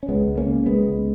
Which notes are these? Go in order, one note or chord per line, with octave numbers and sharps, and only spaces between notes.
C#4
C#2 G#3 B3
C#2
A#3 C#4
C#3
C#2 G#3 B3
C#2